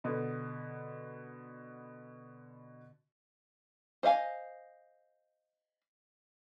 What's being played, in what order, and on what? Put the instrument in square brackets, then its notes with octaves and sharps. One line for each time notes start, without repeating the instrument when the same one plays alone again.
[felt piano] B2 D3 B3
[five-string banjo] C5 D#5 F5 G#5